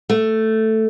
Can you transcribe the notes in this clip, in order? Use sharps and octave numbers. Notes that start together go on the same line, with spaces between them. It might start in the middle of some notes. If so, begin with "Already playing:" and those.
A3